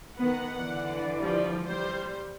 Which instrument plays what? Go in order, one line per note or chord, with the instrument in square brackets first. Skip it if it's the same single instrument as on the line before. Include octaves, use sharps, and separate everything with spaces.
[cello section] D#3 B3 [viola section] F#5
[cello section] D3 E3 D5
[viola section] F3 G3
G3 C5